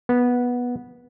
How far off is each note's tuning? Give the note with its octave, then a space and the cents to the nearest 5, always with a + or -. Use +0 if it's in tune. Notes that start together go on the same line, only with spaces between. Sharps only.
B3 -10